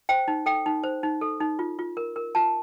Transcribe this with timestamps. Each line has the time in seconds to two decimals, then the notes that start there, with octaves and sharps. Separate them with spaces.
0.09 C5 G5
0.28 D#4
0.46 A4 G5
0.66 D#4
0.84 C5
1.03 D#4
1.21 A4
1.40 D#4
1.59 F4
1.79 F4
1.97 A#4
2.16 A#4
2.35 F4 A5